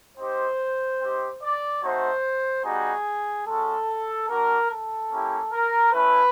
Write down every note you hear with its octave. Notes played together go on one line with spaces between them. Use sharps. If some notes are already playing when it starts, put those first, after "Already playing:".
C4 D#4 G4 C5
C4 D#4 G4
D5
A3 C4 D#4 F#4 C5
G3 B3 D#4 F#4 G#4
G#3 C#4 F#4 A4
A#3 D4 F#4 A#4
A4
A#3 C#4 E4 G4
A#4
A3 C#4 E4 B4